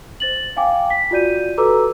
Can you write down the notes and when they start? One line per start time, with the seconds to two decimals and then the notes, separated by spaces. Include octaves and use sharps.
0.20 C5 A6 F#7
0.56 F5 G5 G#5 D6
0.90 B6
1.11 F4 F#4 D5 G6 D#7
1.57 F#4 A4 B4 A#5 D6 E6